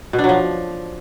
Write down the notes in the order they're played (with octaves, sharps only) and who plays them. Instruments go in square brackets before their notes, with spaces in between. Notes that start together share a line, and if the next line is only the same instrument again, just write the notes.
[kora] B2
D4
F#3
F3